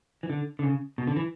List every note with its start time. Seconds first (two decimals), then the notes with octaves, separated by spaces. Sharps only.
0.23 E3
0.30 D3
0.59 D3
0.63 C#3
0.98 B2
1.07 D3
1.16 E3